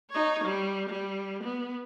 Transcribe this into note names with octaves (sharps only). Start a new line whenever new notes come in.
D#4 C#5
G3
G3
B3